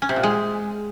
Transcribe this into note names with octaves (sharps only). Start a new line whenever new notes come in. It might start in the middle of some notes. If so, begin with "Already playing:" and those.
C#4
C3
A#2
G#3